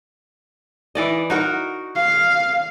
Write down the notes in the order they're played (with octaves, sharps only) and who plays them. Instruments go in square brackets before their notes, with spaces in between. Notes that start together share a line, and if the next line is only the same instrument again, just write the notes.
[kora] E3 D5 D#5
D#4 F#4 A#4
[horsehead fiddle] F5